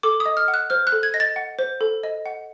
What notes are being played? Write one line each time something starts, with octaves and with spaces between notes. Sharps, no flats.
A4 D6
D#6
D#5
F6
F#5
F#6
C5 F6
F#6
A4
G#6
D#5 A#6
A6
F#5
C5
A4
D#5
F#5